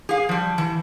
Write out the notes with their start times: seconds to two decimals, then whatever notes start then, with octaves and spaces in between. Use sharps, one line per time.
0.09 G#4 F5
0.29 F3 G3
0.58 E3